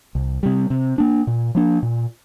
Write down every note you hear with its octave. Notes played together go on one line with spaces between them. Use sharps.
C2
C3 G3
C3
A#3 D4
A#2
F3 A#3 D4
A#2